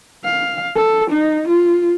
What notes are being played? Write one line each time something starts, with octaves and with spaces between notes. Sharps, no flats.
F5
A4
D#4
F4